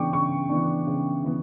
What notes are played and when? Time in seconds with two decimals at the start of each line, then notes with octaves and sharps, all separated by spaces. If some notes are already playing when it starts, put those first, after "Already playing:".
Already playing: C#3 E3 B3 D4 G5 C#6 D6
0.13 C#3 C#6
0.49 E3 B3 D4
0.87 C#3
1.24 E3 B3